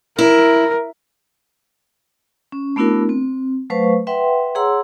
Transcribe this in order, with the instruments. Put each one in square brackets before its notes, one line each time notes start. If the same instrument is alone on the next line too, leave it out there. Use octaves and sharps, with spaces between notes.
[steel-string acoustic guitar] E4 [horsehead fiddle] A#4
[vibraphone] C#4
A3 B3 D4 E4 F#4 A#4
C4
F#3 A3 B4 C5 F5 C#6
B4 E5 F#5 G5 C6
G#4 C#5 F#5 A#5 C6 E6